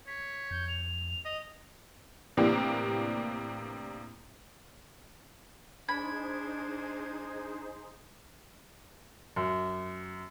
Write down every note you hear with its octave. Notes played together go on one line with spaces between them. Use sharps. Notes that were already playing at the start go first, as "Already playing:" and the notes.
C#5 B6
F2 G6
F7
D#5
A2 C3 E3 A#3 D4 G4
D4 D#4 G#4 C5 B5 G#6
F#2